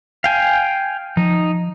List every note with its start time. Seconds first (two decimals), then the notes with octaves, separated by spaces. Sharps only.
0.24 F5 G5 G#5
1.17 F3 D#4